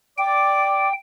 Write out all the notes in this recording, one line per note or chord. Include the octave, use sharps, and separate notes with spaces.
D5 G5 D6